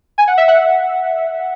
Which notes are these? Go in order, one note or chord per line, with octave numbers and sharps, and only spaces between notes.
G#5
F#5
E5
F#5